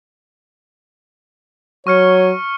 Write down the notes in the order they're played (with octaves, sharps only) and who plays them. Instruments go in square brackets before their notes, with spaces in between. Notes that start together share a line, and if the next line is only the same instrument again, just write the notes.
[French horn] F#3 [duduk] C#5 [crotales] C#6 F6 C#7